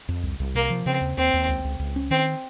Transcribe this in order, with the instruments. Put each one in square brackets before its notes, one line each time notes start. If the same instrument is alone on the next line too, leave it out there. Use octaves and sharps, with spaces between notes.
[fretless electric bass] F2
C2
C2
[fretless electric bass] C3 [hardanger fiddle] A#3
[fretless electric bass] F3
[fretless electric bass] C#3 [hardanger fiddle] C4
[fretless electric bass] D#2
[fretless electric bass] D#2 [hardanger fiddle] C4
[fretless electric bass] D#2
C#2
C#2
C#2
C#4
[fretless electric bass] D#3 [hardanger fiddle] C4